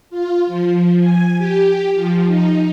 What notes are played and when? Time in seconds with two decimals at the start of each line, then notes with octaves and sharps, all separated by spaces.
0.10 F4
0.47 F3
0.99 G#5
1.38 G4
1.94 F3
2.26 D#4